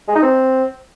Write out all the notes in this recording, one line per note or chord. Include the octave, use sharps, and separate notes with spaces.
G#3
D#4
C4